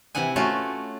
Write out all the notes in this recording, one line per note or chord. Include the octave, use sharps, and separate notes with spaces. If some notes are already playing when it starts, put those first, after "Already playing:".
C3 E3 E4 F#5 G#5
A3 C#4 F4 F#4 C#5